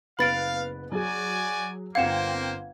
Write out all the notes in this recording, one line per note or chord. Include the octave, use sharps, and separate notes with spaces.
F#1 B3 B4 F5 B5 A6 D7
F#3 F#4 G#4 D5 G#5
G1 A#3 C4 C5 F5 F#5 G#6 E7